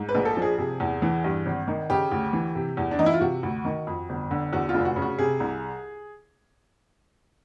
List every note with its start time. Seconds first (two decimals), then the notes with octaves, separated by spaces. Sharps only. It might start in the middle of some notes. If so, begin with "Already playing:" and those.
Already playing: G#2
0.09 B4
0.15 A#1
0.25 A4
0.37 F3
0.42 G#4
0.58 C3
0.80 E2
1.02 E3
1.24 G2
1.46 G#1
1.68 D#3
1.90 C#3 G4
2.12 D2
2.33 E3
2.55 C3
2.77 E2
2.91 D4
2.99 E3 D#4
3.06 E4
3.14 F4
3.21 C3 F#4
3.43 D2
3.65 D#3
3.87 F2
4.09 G1
4.31 D3
4.53 E2 F#4
4.69 F4
4.74 F1
4.85 F#4
4.96 C#3
5.02 F#4
5.18 C3 G#4
5.40 C2